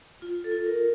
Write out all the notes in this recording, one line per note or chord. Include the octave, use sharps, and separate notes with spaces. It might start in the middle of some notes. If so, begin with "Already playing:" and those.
F4
A4
F4
A#4